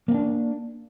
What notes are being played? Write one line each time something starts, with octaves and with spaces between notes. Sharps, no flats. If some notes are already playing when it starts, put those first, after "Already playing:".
A#3 C4 D4